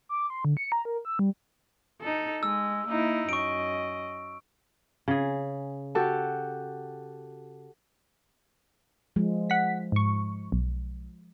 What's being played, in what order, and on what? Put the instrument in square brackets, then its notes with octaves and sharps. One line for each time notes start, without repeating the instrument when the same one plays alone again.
[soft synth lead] D6
C6
D3
C#7
A#5
A#4
E6
G3
[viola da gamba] D#4 A4
[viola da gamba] G#3 [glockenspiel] E6
[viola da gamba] A#3 D#4 E4
[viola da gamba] F#2 D#5 [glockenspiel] C#6 D7
[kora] C#3 G#4
[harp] F#4 G4 A4
[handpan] F3 G#3
[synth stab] F#5 B6
G#2 C#6
B1